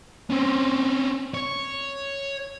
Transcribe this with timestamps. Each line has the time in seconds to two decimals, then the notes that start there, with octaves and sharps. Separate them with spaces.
0.30 C4 C#4
1.34 C#5